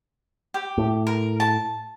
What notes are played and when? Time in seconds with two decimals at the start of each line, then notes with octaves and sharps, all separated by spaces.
0.54 G4
0.78 A2
1.07 A#4
1.40 A5